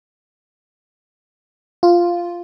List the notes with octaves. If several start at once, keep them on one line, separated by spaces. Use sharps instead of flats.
F4